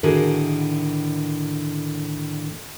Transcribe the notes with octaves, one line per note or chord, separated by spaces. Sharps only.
A2 D3 D#3 F#4 G#4